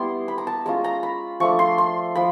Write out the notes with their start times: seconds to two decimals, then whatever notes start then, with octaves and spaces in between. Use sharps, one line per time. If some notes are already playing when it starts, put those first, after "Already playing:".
Already playing: G3 B3 E4 C6
0.28 B5
0.38 A#5
0.47 A5
0.66 G#3 C#4 F4 A#5
0.84 A#5
1.03 B5
1.40 F3 A3 D4 C#6
1.59 C6
1.78 C6
2.15 F3 B5